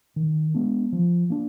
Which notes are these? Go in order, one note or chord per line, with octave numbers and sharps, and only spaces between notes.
D#3
G#3 B3 D4
F3
A#3 D4